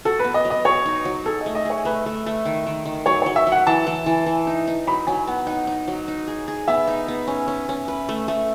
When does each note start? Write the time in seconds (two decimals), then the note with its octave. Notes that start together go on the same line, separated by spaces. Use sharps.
0.05 F#4 A4
0.19 B4
0.24 B3
0.34 D#5
0.45 F#3
0.50 D#5
0.65 F#4 C#5
0.86 D#4
1.05 F#3
1.26 G#4 A4
1.41 D#5
1.46 A3
1.55 D#5
1.65 G#4 C#5
1.85 A3 B4
2.06 A3
2.26 A3
2.45 D#3
2.67 D#3
2.86 D#3
3.06 F#3 C#5
3.22 F#3 C#5
3.36 E5
3.47 F#3
3.52 F#5
3.67 E3 A5
3.87 E3
4.06 E3
4.26 E3
4.47 D#4
4.68 D#4
4.87 F#3 B5
5.07 F#3 G#5
5.27 B3 F#5
5.47 D#4 F#5
5.67 D#4
5.88 F#3
6.08 D#4
6.28 G#4
6.48 G#4
6.68 B3 E5
6.88 D#4
7.08 B3
7.28 C#4
7.48 C#4
7.69 C#4
7.88 B4
8.09 A3
8.28 A3